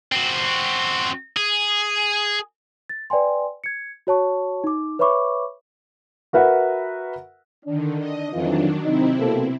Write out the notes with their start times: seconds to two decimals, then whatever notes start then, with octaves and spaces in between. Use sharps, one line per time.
0.12 C4 F#4
1.37 G#4
2.89 A6
3.10 B4 D5 G5 G#5 C6
3.64 G#6 C#7
4.07 F#4 C#5 A5 C#6
4.64 D#4 D6
4.99 B4 C#5 E5 B5 C#6 D6
6.33 F#4 A#4 B4 E5 F#5
7.66 D3 D#3 D4
7.98 D#5
8.33 F2 D#3 E3 F#3 D4 F4
8.84 C3 C4 D#4 E4
9.19 B2 A#3 A4